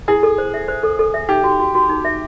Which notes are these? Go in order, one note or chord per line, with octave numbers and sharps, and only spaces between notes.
E4 G#4
A4
C5
E5
C5
A4
A4
E5
D#4 G4
F#4
F#4
F#4
D#4
E5